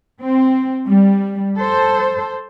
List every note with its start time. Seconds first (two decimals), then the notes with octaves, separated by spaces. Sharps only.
0.21 C4
0.87 G3
1.58 A4 C5